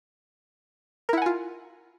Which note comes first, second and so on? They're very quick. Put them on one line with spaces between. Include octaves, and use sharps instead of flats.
A#4 E4 F#5 G#5 F4